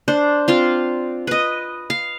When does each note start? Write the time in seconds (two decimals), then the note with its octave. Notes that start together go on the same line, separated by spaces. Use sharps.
0.08 D4 C5
0.48 C4 F4 F5
1.27 B4 D#5
1.90 F5